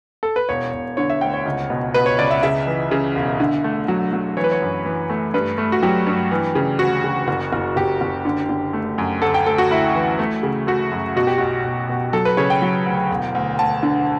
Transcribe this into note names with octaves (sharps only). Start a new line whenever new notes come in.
A4
B4
E1 C#5
E1
D3 C#5
E5
D2 G5
C#5
C#2
B2
B2 B4
C#5
C#2 D5
E5
C#3 E5
E3
C#3
E1
D3
A3
F#3
F#3
E3 C#5
B4
C#5
F#2
E3
A3
G2 B4
A3
F#4
F#3 G4
G2
E3
C#3
D2 F#4
C#3
F#1
F#1
F#1 G4
F#1
D3
D3
A3
F#2
D2 A4
G5
D2 A4
F#4
D2 E4
E3
A3
C#3
A3 F#4
F#2
B2 F#4
G4
B1 F#4
B1
B2
F#3 A4
B4
C#3 C#5
G5
F#3
D2
E1
D2
D2 A5
D3